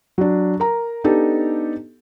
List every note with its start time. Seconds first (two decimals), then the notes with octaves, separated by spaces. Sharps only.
0.18 F#3 D4
0.60 A#4 A#5
1.04 B3 D4 D#4 G4 A4